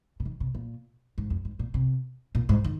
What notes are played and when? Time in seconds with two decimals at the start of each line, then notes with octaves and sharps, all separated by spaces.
0.20 C3
0.25 D#3
0.40 C3
0.55 A#2
1.18 G#2
1.30 F2
1.45 G#2
1.59 A#2
1.74 C3
2.35 A#2
2.49 G#2
2.64 D#3